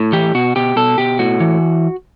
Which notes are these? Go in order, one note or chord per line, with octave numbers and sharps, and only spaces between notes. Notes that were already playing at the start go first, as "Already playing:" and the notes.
Already playing: A2
E3 G4
B2 F#4
B2 G4
B2 A4
B2 G4
A2 F#4
E3